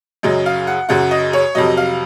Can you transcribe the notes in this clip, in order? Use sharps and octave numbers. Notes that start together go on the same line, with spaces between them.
F#2 C#3 F#3 D#5
F5
F#5
F#2 C#3 F#3 F#5
D#5
C#5
F2 C3 F#3 D#5
F5